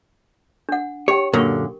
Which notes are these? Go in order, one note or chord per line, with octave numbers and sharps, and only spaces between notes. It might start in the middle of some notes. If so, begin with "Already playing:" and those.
D4 F#5
G4 C#5 G5
F#2 A#2 D3 A#4 C#6